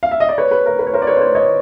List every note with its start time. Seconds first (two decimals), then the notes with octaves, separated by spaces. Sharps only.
0.03 F5
0.11 E5
0.20 D#5
0.29 D5
0.38 B4 C#5
0.51 B4
0.66 A#4
0.79 B4
0.87 C#5
0.93 A#4 C5
1.02 D5
1.07 B4 C#5
1.16 C5
1.21 B4 C#5
1.35 C#5 D#5